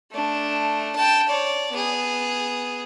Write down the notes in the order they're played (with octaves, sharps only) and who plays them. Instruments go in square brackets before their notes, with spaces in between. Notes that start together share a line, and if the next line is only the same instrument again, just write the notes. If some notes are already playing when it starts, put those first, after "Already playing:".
[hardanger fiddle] A3 D4
G5 A5
C#5 D5
B3 G#4